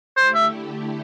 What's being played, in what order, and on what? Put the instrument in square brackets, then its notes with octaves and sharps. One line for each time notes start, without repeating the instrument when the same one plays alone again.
[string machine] D3 A3 E4 G4 [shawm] C5
[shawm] E5